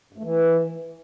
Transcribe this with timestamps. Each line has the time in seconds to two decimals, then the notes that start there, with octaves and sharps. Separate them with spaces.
0.13 G2
0.18 A3
0.23 E3